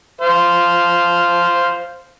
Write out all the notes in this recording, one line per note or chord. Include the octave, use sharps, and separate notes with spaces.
C5 F5